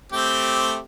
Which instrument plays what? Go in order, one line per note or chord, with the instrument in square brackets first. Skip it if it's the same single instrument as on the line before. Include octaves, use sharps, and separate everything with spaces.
[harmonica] A3 C4 G4